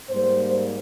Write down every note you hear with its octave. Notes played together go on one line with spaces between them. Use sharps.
G#2 G3 A#3 C5